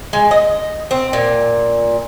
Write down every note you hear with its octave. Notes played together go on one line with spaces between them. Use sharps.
G#3
D#5
C4
A#2